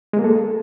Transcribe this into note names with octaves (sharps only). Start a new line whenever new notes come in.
G#3
A#3
A4